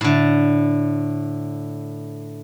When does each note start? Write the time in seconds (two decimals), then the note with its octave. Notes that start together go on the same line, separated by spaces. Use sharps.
0.01 A2 D3